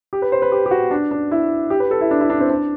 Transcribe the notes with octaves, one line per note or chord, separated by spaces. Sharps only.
G4
B4
C5
B4
G4
G4
F#4
D4
D4
E4
G4
B4
A4
E4
D4
E4
D4
C4
D4